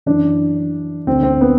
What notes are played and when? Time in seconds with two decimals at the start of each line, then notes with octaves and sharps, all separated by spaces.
0.06 F#2 E3 D4
1.07 D2 D3 C4
1.23 C4
1.41 B3